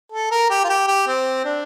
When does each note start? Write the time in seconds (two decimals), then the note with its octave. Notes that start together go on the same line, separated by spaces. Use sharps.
0.12 A4
0.31 A#4
0.50 G4
0.64 F4
0.69 G4
0.87 G4
1.07 C4
1.45 D4